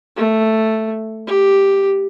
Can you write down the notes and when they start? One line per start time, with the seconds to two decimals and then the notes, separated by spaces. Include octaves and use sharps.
0.17 A3
1.27 G4